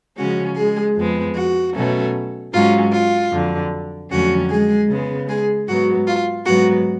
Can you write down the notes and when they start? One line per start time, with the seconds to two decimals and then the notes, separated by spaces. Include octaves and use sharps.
0.18 C#3 F3 G#3 C#4 F#4
0.57 G#3 G#4
0.97 F2 F3 G#3 B3
1.35 F#4
1.75 B2 F#3 A3 C#4
2.53 G#2 F#3 C#4 F4
2.92 F4
3.32 F2 D3 F#3
4.11 F2 D3 F#3 A3 C#4 F#4
4.49 G#3 G#4
4.89 C#3 G#3 B3
5.28 G#3 G#4
5.67 G#2 F#3 B3 F#4
6.07 F4
6.46 G#2 F#3 B3 F#4